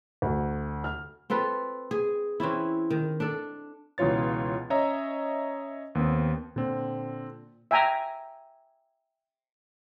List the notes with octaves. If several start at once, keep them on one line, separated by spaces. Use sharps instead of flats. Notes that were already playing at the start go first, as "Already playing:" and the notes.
D2
F6
C4 F4 A4 B4
G#4
E3 C4 C#4 E4
D#3
D4 A4
C#2 B2 E3 F4 C#5 A6
C#4 C#5 D#5 E5 A#5
D#2 B3 C4
A#2 D3 C4
E5 G5 G#5 A#5